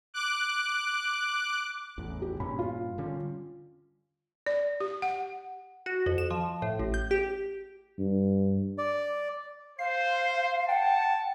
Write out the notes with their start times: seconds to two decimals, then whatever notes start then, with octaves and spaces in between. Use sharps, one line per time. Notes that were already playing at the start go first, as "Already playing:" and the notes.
0.14 D6 F#6
1.98 A1 E2
2.22 G4
2.40 G2 A#2 C#4 B5
2.59 F4
2.98 D3 G3 C#4
4.47 D5
4.80 G4
5.02 F#5
5.86 F#4
6.06 F2
6.18 E7
6.31 F3
6.62 A2
6.79 A1
6.94 G6
7.11 G4
7.98 G2
8.78 D5
9.79 C5 F5 C7
10.69 F#5 G5 A5